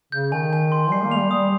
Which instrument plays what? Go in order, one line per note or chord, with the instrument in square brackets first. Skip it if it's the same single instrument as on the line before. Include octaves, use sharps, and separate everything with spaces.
[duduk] C#3 [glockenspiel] G6
[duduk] D#3 [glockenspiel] G#5
[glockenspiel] G#5
C6
[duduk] G3 [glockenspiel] C7
[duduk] A#3
[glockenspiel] F7
[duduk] G3
[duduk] G3 [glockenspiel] D#6